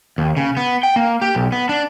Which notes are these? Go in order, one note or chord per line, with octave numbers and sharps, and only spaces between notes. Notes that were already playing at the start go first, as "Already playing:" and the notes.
D#2
C#3
B3
G5
A#3
G4
B1
B3
D4